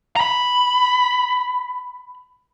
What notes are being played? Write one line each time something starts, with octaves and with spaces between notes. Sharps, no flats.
A#5 B5